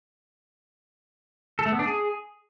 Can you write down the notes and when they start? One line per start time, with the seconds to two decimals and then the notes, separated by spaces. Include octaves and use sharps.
1.59 A4
1.66 A3
1.72 B3
1.79 D4
1.86 G#4